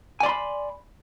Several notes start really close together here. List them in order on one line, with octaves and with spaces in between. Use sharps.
G#5 D5 C6 B5